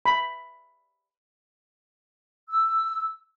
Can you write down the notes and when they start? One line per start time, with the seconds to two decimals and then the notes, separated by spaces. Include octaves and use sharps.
0.06 B5
2.49 E6